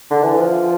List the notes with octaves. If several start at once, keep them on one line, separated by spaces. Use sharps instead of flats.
D3
E3
F3